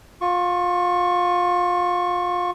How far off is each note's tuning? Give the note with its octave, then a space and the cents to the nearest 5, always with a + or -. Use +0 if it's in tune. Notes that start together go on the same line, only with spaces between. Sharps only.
F4 +25 C#6 +0